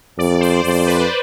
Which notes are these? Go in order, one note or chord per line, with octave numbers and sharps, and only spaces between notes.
F2 D5
C5
F2 C5
D5
C5
B4